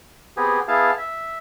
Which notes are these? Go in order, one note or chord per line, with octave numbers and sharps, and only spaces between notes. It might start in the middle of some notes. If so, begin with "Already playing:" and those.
B3 C4 G4 G#4
B3 E4 G#4 F5 A5
E5